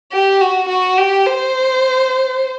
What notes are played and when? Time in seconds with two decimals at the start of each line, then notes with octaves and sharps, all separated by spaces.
0.12 G4
0.41 F#4
0.69 F#4
0.98 G4
1.27 C5